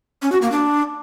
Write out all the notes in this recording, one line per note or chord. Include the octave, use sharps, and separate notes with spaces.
C#4
F#4
A#3
D4